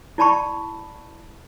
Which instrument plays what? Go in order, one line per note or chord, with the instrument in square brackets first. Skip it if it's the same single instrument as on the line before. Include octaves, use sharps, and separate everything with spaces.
[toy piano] E4 D5 A5 B5 C#6